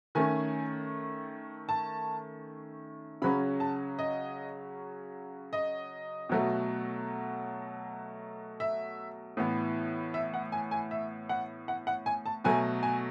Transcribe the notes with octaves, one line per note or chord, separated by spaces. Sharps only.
D#3 A3 C#4 G#5
A5
C#3 F#3 C#4 B5
A5
D#5
D#5
B2 F#3 A3
E5
A2 E3 B3
E5
F#5
G#5
G#5
E5
F#5
F#5
F#5
G#5
A5
B2 F#3 A3 G#5
G#5